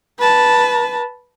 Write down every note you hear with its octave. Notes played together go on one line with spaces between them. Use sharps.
B4 A5